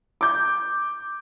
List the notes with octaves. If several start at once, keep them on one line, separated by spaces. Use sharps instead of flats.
D6 G6